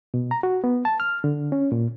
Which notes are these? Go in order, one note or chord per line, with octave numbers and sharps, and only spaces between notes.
B2
A#5
F#4
B3
A5
F6
D3
C#4
A#2